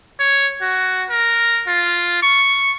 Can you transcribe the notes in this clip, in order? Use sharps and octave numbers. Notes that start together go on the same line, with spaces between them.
C#5
F#4
A#4
F4
C#6